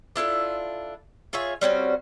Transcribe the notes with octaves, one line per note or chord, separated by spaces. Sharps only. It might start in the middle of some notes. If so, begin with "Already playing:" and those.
D4 E4 F4 A4
F4 G#4 C#5 E5
G3 C4 C#4 F#4